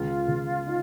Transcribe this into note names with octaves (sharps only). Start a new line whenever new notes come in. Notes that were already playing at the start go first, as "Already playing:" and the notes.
Already playing: C#2 F4
C#2
D#4